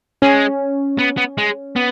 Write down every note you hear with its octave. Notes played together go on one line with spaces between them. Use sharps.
G#3 C#4
B3
B3
G#3
B3